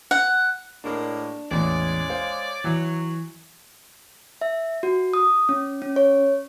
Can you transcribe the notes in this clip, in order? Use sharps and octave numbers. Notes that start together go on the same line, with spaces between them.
F#5
A2 G#3 A#3 D4
A1 E2 G#3 C#5 D5
C5 F5
E3 F#3
E5
F#4
D#6
C#4
C#4
C#5